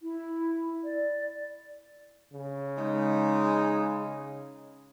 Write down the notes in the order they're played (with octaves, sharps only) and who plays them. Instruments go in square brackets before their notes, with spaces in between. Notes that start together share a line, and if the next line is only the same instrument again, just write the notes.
[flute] E4
D5
[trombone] C#3
[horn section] G#3 D#4